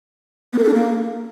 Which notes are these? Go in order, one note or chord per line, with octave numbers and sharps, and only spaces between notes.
B3
A#4
A4
D4
A#3